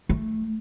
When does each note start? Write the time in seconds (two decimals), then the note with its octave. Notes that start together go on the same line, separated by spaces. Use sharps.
0.09 A3